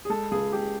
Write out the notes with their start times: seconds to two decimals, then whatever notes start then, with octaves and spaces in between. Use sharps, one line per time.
0.05 G#4
0.10 G#3 A4
0.31 C#2 G#4
0.53 C#2 G4